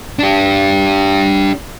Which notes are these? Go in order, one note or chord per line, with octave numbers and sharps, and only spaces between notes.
D4 G4